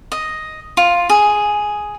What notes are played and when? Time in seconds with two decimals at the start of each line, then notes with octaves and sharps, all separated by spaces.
0.12 D#5
0.77 F4
1.10 G#4